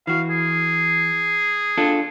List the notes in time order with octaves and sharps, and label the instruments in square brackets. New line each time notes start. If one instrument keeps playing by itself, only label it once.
[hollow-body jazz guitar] E3 F#4 [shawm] F5
[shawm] G#4
[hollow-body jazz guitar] D4 F4 A4